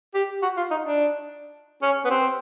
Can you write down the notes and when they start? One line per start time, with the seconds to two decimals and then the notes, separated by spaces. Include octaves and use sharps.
0.15 G4
0.43 F#4
0.57 F4
0.71 D#4
0.85 D4
1.82 C#4
2.05 B3
2.10 C4